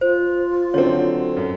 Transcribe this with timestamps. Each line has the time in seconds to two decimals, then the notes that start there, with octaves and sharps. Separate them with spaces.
0.01 F4 C5
0.74 D3 F#3 C4 C#5
1.37 F#2